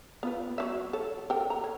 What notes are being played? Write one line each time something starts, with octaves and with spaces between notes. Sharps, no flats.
B3 F4 B4
F#3 C#4 E5
A4 C#5
A4 A#4 G5
A#5
C#5